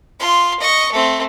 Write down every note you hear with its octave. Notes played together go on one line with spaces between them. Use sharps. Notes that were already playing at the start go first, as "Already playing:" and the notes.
F4 C6
D#5 C#6
A3 C4